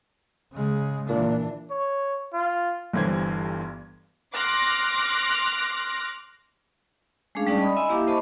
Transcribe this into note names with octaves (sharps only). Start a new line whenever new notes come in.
C#3 G#3
A#2 E3 D4
C#5
F4
G1 G2 E3 C5 G#6
C6 D6 F6 F#6 A#6
G#3 A3 C#4 D4 G#4 F5
G3 C#4 D#4 D5 A5
D#5 B5 D#6
D#5 E5 G#5 B5 C6 E6
A#3 E4 G4 E5 F5 D6
C5 D#5 A5 B5 C#6 D6